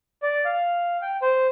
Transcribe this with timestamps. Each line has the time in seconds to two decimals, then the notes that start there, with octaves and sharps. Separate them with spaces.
0.22 D5
0.45 F5
1.02 G5
1.22 C5